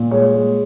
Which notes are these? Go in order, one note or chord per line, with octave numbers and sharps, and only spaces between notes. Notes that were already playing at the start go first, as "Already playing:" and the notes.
Already playing: A#2
G#3 C#5
G#3